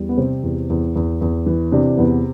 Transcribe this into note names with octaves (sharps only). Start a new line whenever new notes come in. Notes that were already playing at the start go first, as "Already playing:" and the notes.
Already playing: E2 G3
B3
C3 C4
E2
E2
E2
E2
E3
C3 D4
E2 B3